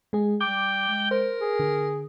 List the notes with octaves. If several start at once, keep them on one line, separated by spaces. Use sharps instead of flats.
G#3 G#4
G3 G5 D6
G#3
A#4 C5
G#4
D3